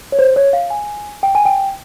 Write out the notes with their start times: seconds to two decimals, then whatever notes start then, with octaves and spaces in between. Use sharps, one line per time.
0.12 C#5
0.19 C5
0.36 C#5
0.53 F5
0.70 G#5
1.23 G5
1.35 G#5
1.45 G5